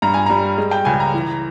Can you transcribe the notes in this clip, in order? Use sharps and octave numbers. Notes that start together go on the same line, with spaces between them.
G2 A#5
G#5
G3 A#5
G#3
G5
C#2 G#5
A#5
E3